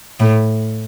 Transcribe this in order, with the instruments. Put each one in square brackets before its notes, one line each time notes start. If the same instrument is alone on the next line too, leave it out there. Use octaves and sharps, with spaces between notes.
[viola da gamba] A2